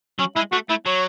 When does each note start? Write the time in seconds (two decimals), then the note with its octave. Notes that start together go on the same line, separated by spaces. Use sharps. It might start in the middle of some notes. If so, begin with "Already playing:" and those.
0.19 F#3 C#4
0.36 G#3 E4
0.52 A3 F#4
0.69 A3 E4
0.86 F#3 C#5